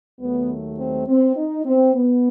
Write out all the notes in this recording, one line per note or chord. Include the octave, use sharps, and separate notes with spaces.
D#2 D#3 F#3 A3 B3
C4
C4
D#4
C4
B3